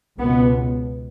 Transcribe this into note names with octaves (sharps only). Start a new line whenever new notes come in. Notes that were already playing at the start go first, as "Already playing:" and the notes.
C#2 B2 B3